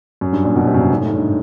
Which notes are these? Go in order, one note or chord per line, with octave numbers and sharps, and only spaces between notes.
F#2
G2
A#2
B2
C3
F#2
G2
G#2
A2
G#2
G2